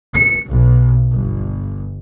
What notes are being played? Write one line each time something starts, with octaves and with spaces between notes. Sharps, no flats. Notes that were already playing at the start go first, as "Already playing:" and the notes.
C#7
B1
G1